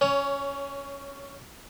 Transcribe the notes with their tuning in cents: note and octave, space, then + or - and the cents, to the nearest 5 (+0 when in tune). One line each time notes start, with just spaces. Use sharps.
C#4 +0 C#5 +20